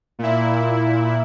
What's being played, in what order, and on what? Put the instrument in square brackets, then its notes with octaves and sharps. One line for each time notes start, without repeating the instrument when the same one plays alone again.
[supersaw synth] A#2 E4